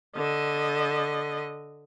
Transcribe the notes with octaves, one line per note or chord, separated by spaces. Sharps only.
D3 D#5